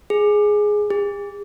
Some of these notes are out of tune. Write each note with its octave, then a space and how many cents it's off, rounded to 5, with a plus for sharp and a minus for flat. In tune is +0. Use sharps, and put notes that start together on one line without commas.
G#4 +5
G#4 -45